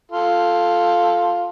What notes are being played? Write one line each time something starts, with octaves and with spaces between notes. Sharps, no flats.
F4 A4